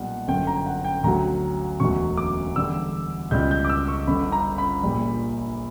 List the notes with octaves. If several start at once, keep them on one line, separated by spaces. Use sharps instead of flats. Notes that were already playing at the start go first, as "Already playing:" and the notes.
Already playing: B1 A#2 G3 F#5
G1 F#2 D3 G5
A#5
G5
F#5
G5
D2 D3 F#3 A#5
E1 D2 D3 F#3 C#6
D6
E2 D3 G3 E6
C#2 B2 G3 G6
G6
D6
E6
C#6
G1 G2 D3 B5
A#5
B5
A#1 A#2 G3